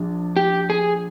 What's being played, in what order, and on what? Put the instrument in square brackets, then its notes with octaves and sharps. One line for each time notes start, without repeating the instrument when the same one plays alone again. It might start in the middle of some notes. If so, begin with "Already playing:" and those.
Already playing: [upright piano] A#1 D4
[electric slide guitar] G4
G#4